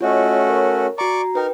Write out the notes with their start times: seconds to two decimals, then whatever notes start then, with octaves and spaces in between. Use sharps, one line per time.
0.01 A3 C#4 F4 F#4 C#5 D#5
0.47 A#4 C#5
0.98 F#4 D5 A#5 C#6 D6
1.35 D#4 A#4 B4 G5